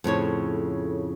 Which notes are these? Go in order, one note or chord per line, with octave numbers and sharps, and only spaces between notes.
F2 A2 C#3 C#5